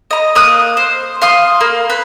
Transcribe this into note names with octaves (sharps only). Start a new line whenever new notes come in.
D#5 A#5
A#3 D#6 F#6
C5
F5 C6 D#6
A#3
B4